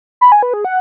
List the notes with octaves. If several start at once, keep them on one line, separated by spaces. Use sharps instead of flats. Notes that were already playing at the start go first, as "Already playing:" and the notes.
B5
G#5
B4
G#4
F#5